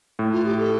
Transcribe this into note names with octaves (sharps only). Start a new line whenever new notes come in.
A2
F4
G4
A4